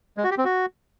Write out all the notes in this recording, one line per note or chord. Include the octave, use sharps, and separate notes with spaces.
G#3
F#4
G4
C4
F#4